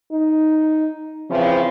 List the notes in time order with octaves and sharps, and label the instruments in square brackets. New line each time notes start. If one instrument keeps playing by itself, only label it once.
[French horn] D#4
[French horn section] C#3 E3 F3 [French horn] C4